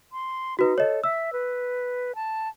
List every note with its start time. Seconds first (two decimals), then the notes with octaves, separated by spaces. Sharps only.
0.12 C6
0.59 D#4 F#4 B4
0.78 A4 C#5 D#5
1.04 E5 E6
1.33 B4
2.15 A5